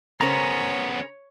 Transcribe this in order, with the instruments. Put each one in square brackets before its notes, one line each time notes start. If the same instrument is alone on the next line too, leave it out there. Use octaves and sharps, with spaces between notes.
[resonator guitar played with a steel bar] C#3 A#4 C5 [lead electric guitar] B3 C#4 [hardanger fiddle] C#5 [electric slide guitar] A#5